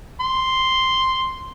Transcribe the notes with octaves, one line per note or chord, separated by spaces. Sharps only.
C6